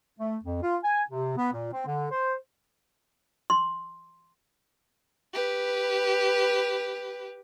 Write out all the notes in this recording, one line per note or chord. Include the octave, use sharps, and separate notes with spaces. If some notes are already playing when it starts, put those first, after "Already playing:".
A3
F2
F4
G#5
C3
B3
A#2
C4
D3
C5
C6
G4 B4